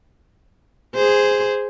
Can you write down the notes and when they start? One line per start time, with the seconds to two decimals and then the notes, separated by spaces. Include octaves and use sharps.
0.95 G#4 C5